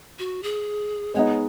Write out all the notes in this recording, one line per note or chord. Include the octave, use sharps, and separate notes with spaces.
F#4
G#4
G#3 B3 D#4 C#5